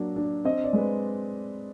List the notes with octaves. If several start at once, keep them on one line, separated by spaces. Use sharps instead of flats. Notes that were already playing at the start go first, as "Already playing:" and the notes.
Already playing: F#3 A#3 D4
D4
C4 D#5
D5
G#3 B4